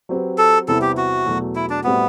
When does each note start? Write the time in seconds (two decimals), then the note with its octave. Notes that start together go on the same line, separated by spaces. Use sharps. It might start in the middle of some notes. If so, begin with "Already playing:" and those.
0.09 F#3 C4 G4 B4
0.38 A4
0.68 E2 C3 G3 B3 E4 A4
0.82 G4
0.97 F#4
1.26 E2 B2 F#3 A3
1.56 E4
1.70 D4
1.84 A2 G3 B3 C4 F#4